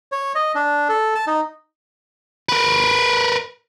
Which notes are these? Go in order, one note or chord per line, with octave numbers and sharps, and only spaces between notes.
C#5
D#5
D4
A4
A5
D#4
A#4 B4